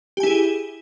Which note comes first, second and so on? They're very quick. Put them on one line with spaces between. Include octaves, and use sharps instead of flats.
G4 G#5 E4 G#4